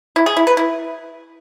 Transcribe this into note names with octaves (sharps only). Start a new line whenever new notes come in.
E4
G#4
E4
B4
E4